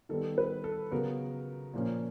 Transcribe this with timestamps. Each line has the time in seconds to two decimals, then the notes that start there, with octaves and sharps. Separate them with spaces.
0.09 D#3 G3 B3 A4
0.38 B4
0.64 A4
0.91 C#3 F#3 B3 A#4
1.74 A#2 F3 A#3 C#4